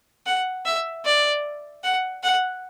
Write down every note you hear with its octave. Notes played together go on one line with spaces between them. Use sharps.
F#5
E5
D5
F#5
F#5